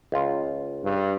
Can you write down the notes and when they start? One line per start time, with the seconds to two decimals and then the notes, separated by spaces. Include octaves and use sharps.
0.12 C#2 F4
0.84 G2